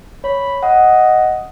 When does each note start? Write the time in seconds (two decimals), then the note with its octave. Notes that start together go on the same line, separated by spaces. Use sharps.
0.24 C#5 B5
0.63 D#5 F#5